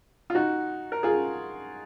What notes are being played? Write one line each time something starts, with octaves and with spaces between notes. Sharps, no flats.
F4
D#4 F#4
A#4
F4 G#4